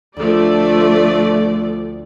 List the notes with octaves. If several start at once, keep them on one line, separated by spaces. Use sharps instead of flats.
D2 F3 A3 D5